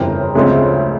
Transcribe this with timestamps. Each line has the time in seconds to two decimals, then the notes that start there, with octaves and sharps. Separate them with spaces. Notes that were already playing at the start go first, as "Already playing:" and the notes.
Already playing: G1 F2 C#3 E3 G3 A#4 C5
0.35 D2 C#3 F3 G#3 C4